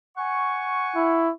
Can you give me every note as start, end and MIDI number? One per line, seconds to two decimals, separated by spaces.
0.17 1.31 78
0.17 1.31 80
0.17 1.31 85
0.95 1.31 64